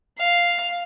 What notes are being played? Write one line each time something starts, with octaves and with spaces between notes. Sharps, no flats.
F5